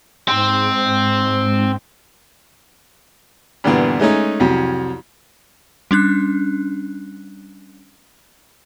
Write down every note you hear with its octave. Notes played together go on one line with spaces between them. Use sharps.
G#2 C4
G2 A#2 D3 E3 B3
G#3 A3 C#4 D#4
C2 F2 F#3
G3 C#4 D4 F#6